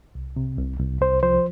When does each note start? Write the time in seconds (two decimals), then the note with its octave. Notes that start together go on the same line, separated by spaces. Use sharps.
0.15 C2
0.36 C3
0.58 C2
0.79 C2
1.01 C2 C5
1.23 F3 C5